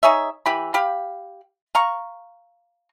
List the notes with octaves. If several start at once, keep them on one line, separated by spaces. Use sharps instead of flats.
D#4 G#4 C#5 E5
E3 G4 B5
G4 F5 B5
F5 A#5 C#6